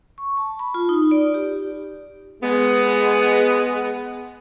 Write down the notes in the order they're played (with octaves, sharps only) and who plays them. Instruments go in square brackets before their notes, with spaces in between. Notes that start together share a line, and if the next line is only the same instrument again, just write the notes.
[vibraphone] C#6
A5
B5
F4
D#4
D5
G4
[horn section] G#3 B3